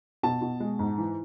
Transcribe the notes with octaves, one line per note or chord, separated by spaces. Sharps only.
B2 A5
B2
G#3
G#2
E3